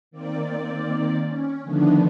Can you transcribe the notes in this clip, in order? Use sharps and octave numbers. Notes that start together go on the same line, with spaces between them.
D#3 A#3 C4 D5
C#4
D3 D#3 F3 A3 B3 D4